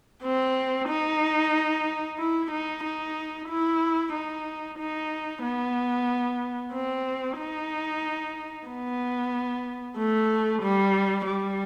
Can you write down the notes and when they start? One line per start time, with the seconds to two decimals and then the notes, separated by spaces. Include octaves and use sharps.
0.24 C4
0.89 D#4
2.19 E4
2.51 D#4
2.84 D#4
3.49 E4
4.13 D#4
4.79 D#4
5.43 B3
6.73 C4
7.38 D#4
8.68 B3
9.97 A3
10.62 G3
11.26 G3